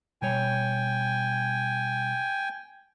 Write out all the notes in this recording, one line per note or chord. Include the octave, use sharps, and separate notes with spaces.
B2 G3 C#5 G5 G#5